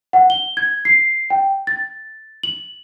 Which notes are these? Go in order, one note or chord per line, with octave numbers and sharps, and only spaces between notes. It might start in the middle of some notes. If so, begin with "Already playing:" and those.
F#5
G7
G#6
C7
G5
A6
F#7